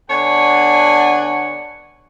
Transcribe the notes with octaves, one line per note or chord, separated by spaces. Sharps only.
D3 B3 D4 C#5 F#5 G#5